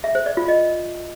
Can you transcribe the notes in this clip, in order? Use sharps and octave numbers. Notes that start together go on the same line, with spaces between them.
E5
C5
D5
F4
D#5